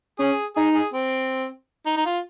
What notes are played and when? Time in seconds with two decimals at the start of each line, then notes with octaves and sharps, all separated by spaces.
0.19 C#4 G#4
0.56 D#4 G#4
0.75 G#4
0.93 C4
1.86 D#4
1.97 D#4
2.06 F4